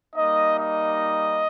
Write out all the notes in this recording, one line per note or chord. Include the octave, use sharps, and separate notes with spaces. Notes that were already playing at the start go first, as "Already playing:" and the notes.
G3 A#3 D#4 D#5
D#5